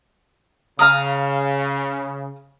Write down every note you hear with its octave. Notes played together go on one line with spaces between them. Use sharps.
C#3 F5 A#5 D#6